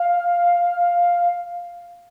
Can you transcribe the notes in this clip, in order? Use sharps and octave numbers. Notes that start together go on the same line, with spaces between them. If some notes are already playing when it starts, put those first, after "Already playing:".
Already playing: F5